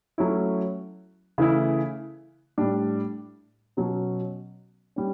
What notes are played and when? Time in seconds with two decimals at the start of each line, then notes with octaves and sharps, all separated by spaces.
0.18 F#3 A3 C#4 E4
1.38 C#3 E3 A3 E4
2.58 A2 G3 D4
3.77 B2 F#3 C#4
4.96 G3 C#4